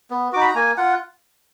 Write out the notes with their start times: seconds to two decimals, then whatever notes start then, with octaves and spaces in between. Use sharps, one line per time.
0.10 B3
0.33 D#4 F#4 D6
0.41 B5
0.47 A#5
0.55 A#3 G#5
0.77 F4 F#5